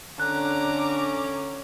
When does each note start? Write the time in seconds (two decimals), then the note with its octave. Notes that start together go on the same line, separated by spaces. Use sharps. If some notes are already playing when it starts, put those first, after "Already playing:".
0.20 D3 C#4 A#5 D6 F#6